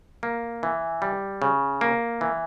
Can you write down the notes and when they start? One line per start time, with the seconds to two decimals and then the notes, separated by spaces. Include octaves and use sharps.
0.23 A#3
0.63 E3
1.02 G3
1.42 C#3
1.81 A#3
2.21 E3